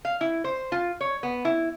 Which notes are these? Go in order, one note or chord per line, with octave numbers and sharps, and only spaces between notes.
F5
E4
C5
F4
C#5
B3
E4